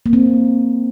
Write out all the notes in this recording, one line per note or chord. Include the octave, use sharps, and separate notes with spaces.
A#3
C4